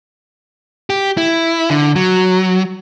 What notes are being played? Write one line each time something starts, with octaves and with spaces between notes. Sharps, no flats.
G4
E4
D3
F#3